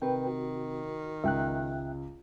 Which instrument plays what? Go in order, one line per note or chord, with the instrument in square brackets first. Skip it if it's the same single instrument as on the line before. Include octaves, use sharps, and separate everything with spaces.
[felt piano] C3 [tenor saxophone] D#3 [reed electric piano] B4 G5
[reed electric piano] F#4
[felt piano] C#2 [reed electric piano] E5 G5 F#6